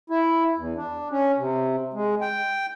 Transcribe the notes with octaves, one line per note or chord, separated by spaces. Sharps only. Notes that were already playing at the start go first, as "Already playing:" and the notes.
E4
E2
D4
C#4
C3
G#3
G5